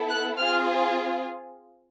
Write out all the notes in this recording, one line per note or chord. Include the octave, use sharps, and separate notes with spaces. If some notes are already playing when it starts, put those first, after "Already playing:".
Already playing: B3 E4 A4
F#6
C4 F4 G#4 F6